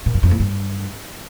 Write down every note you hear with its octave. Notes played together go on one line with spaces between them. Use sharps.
A#2
F#2
F2
A2
G2